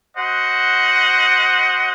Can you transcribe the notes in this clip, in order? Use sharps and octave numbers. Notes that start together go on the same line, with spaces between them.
F#4 C5 D#5 F#5